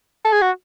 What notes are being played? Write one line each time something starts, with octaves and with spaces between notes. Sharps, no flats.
A4
G#4
F#4